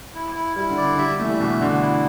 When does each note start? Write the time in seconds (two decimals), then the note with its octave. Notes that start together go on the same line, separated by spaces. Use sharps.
0.15 E4
0.35 E4
0.56 G3 E4
0.70 D3
0.77 D5
0.84 D3
0.98 G3 E5
1.09 G3
1.19 A3 E5
1.25 E3
1.29 G3
1.40 B2 D4
1.61 D3 D4
1.82 E4